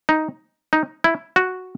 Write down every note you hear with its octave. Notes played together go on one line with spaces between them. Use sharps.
D#4
D#4
E4
F#4